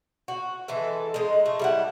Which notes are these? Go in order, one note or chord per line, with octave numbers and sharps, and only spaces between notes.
F#4
E3 G#3 A4 E5
G#3 D#4
A3
G3 E4 F#5